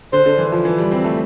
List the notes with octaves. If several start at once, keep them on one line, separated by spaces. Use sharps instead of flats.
D3 C5
D3
E3
F3
E3
G3
C4
A3